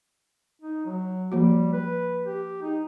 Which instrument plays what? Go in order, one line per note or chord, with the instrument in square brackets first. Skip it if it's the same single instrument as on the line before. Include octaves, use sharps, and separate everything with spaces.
[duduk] D#4
F#3
[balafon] F3 A#3 F#4 [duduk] G3
[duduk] B4
G4
D#4